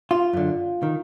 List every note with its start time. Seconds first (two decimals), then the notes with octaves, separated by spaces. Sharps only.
0.11 F4
0.33 F#2 D3
0.83 D#3